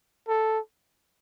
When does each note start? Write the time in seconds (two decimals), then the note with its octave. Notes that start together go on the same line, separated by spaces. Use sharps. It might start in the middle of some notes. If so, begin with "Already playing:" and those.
0.28 A4